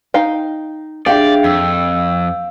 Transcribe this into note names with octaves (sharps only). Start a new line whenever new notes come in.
D#4 F5 G5
D4 G4 G#4 D5 E5 F5 G5
F2 E6